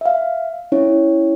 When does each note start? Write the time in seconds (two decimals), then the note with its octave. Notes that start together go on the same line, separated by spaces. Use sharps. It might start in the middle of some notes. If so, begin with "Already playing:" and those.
0.01 E5 F5
0.72 C#4 E4 C#5